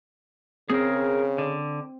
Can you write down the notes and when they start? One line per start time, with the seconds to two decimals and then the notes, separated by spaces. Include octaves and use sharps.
0.70 C#3 C4 G#4 A#4
1.38 D3